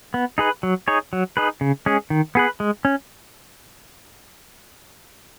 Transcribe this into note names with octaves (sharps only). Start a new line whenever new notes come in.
B3
D#4 G#4 B4
F#3
D#4 G#4 C#5
F#3
D#4 G#4 B4
C#3
G#3 C#4 G#4
D#3
B3 G#4 B4
G#3
C#4